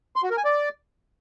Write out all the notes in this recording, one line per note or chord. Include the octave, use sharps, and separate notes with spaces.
C6
F#4
A#4
G#5
D5